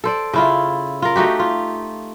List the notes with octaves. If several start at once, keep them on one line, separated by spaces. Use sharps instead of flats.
A4 C5 D5
C#3 E4 F4
F4 A#4
A3 D#4 F#4 G4
F4